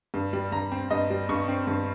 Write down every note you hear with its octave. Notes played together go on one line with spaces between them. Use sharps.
G2
G3
G2 A#5
C4
G2 D#5
G3
G2 C#6
C4
G2